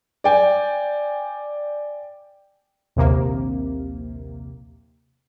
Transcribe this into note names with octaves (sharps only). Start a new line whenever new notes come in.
D5 G5 G#5
A#1 D#2 C3 A#3